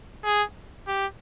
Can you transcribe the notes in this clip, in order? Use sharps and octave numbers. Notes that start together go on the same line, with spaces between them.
G#4
G4